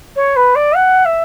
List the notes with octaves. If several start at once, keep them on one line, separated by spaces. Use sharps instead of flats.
C#5
B4
D5
F#5
E5